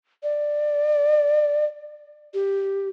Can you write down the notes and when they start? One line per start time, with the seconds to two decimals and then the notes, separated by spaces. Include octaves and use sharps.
0.23 D5
2.34 G4